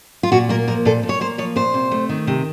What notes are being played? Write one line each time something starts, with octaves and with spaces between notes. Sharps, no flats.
F4
A#2 F#4
A#3 A#4
F3 A#4
A#2 A4
A#2
C#5
A#3 C5
F3 C#5
A#2 C5
C3
A3
D#3
C3